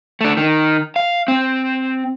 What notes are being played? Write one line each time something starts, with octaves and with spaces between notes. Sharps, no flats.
A3 D4
D#3
F5
C4